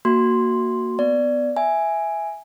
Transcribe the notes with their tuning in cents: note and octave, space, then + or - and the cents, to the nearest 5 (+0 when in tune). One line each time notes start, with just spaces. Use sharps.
A#3 +0 F#4 +0 C6 +0
B3 +15 D5 +0
E5 +0 G#5 +0